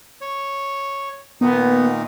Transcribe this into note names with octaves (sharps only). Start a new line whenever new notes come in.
C#5
A#2 D#3 B3 D#4